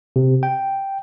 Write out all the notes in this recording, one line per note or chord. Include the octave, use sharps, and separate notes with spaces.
C3
G5